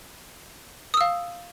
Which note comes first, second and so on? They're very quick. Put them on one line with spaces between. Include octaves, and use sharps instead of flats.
D#6 E6 F5